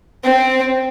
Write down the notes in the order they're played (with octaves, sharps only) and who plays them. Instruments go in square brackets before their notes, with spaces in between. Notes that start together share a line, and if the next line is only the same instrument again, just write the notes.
[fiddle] C4